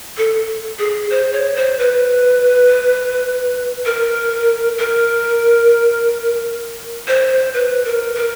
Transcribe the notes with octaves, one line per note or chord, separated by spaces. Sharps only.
A4
G#4
C5
C#5
C5
B4
A#4
A#4
C5
B4
A#4
A#4